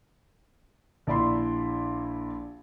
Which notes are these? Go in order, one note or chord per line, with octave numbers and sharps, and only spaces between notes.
A#1 E4 D5 E5 B5 C6